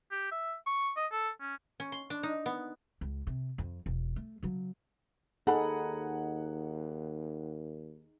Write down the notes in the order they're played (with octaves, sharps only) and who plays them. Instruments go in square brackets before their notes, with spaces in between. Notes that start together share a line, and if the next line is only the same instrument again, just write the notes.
[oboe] G4
E5
C#6
D#5
A4
C#4
[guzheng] C#4
C6
D4
D#4
B3
[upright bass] C#2
C3
F2
E1
A3
C#3 F#3
[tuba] D#2 [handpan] D#4 G#4 [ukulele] A4 B5 [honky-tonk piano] F#5